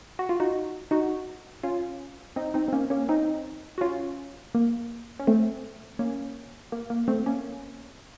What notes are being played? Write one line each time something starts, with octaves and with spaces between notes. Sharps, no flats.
F#4
F4
D#4 F#4
D#4 F#4
C#4 F4
C4 D#4
C4 D#4
C4
A#3 C#4
A#3 C#4
C4 D#4
F#4
C#4 F4
A#3
C#4
A3 C4
A#3 C#4
A#3
A#3
A3 C4
A#3 C#4